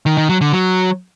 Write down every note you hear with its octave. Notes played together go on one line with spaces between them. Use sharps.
D#3
D#3
F#3
D3
F#3